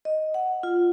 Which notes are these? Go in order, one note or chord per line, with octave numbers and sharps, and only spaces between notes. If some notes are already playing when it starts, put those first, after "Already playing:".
D#5
F#5
F4